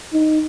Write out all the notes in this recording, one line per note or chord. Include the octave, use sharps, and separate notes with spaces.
D#4